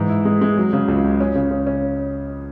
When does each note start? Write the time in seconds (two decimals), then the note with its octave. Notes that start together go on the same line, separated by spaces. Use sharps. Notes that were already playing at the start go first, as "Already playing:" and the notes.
Already playing: G#2 E3
0.09 E4
0.25 G#3
0.41 G#3
0.58 F#3
0.73 C#3
0.88 C#2
1.04 C#2
1.20 C#4
1.35 C#3
1.51 C#3
1.67 C#4